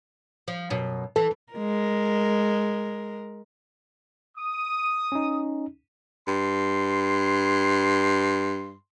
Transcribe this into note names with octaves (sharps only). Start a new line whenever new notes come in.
F3
F#2 B2
E3 A4
G#3 A#4
D#6
C#4 D#4
G2 C6